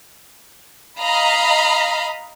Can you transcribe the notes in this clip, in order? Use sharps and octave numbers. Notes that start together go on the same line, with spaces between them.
D#5 F5 A#5 B5